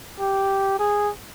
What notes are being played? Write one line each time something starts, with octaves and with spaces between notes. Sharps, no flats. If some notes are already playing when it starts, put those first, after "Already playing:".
G4
G#4